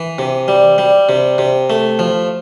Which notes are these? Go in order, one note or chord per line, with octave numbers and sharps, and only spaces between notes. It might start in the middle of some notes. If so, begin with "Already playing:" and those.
Already playing: E3
C3
G3
G3
C3
C3
A3
F3